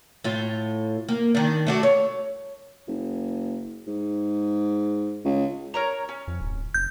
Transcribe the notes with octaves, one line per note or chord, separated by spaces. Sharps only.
A2 F4
A#3
D#3 D4
A3 D4 F#4
C#5
F#1
G#2
C#2
A#4 C#5 A#5
C#4
F2
D1
F#1 G6